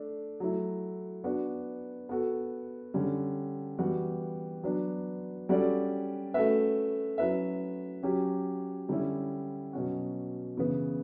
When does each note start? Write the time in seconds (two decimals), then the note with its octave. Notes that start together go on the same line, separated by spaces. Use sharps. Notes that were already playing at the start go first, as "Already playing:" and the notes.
Already playing: A3 D4
0.40 F#3 A3 E4
1.24 B3 D4 F#4
2.09 B3 F#4 A4
2.94 D3 G3 C#4
3.78 E3 G3 B3 F#4
4.63 F#3 B3 D4
5.49 G3 C#4 F#4 A4 D5
6.34 A3 C#4 F#4 B4 E5
7.18 F#3 C#4 E4 B4 E5
8.03 F#3 C#4 G4
8.88 D3 G3 C#4 E4
9.73 B2 F#3 C#4 F#4
10.57 C#3 E3 B3